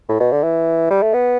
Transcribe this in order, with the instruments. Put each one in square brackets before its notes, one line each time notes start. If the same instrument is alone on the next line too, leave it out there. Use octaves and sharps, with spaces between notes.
[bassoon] A2
B2
D3
E3
G3
A3
B3